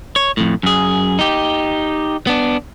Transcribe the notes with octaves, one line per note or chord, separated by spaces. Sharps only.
C#5
F2 A2
F#2 G#4
D#4 G4
B3 D4